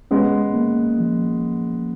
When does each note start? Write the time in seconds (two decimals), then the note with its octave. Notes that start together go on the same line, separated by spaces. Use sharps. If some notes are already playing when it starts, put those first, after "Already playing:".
0.11 G#3 B3 C#4
0.54 A#3
0.98 F3